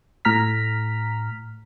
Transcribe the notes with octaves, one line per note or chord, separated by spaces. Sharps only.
A2 A#5 F6 B6